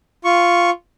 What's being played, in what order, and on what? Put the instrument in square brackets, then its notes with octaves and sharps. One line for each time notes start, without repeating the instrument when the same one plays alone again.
[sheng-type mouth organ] F4 C#6